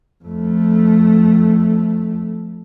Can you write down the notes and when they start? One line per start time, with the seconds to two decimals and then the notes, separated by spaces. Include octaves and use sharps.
0.25 F2 A3